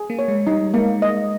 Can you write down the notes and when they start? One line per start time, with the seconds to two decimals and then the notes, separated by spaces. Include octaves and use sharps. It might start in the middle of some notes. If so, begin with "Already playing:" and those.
Already playing: G#4
0.10 A#3
0.19 C#5
0.28 G#3
0.47 G3 D#4
0.74 G#3 A#3
1.02 D#5